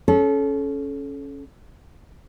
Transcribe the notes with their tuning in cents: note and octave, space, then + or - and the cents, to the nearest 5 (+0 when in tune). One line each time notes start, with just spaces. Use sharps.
C#4 +0 A4 -30